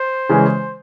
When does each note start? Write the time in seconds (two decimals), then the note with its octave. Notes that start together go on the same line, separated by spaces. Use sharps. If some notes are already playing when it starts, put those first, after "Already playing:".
Already playing: C5
0.29 C#3 E3 G#3